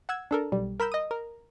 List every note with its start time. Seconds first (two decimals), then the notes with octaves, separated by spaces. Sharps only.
0.09 F#5 E6 G#6
0.31 D4 A4 A#4
0.52 B1 G3
0.80 A#4 B5 E6 G6
0.92 D#5 D#6
1.11 A#4